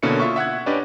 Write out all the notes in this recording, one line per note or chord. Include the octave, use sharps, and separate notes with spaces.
B2 D3 A#3 C#4 E4 C#7
F4 E5 C#6
E5 F#5 F#6 G#6
C#4 D4 G4 B4 D5 D#5